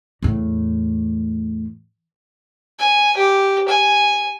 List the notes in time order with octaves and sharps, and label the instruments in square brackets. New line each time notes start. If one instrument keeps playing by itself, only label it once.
[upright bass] E2 A2
[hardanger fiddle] G#5
G4
G#5